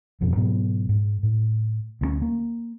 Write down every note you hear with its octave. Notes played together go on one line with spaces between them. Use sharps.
E1 F2 B2 D3
G#2 B2 F#3 B3
G#2
A2
D2 G#3 C#4
A#3